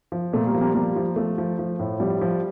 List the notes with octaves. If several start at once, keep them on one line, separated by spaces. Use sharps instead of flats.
F3
A#2 A3
G3 A#3
F3
G3 A#3
F3 G3 A#3
F3
F3 A3
F3
F3
A2
F3 G3
F3